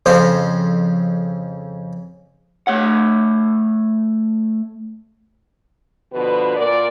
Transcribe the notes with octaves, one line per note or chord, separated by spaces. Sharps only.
F2 C#3 C4 C5
A3 C#5 F#5
B2 D3 F3 B4
A#2 A#4 D5